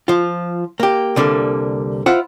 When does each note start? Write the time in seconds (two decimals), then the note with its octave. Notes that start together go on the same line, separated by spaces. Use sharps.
0.08 F3 F4
0.80 A#3 G4
1.16 C2 D3 G3 A#3
2.06 E4 F4 C5 F#5